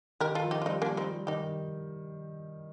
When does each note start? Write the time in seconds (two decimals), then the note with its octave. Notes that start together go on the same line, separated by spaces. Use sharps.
0.20 D#3 G4 A#4
0.35 F4 A4
0.44 F3
0.51 D#4 G4
0.62 F4
0.66 G3 C4 D#4
0.82 A#3 D4
0.89 G3
0.97 C4 D#4
1.12 G3
1.27 D#3 D#4 G4